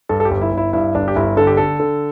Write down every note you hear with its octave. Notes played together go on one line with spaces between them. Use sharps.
G2 A4
A4
G4
G1
E4
G1
E4
G2 E4
G1 D4
G4
G1 E4
D3 A4
G4
D3 A4
D3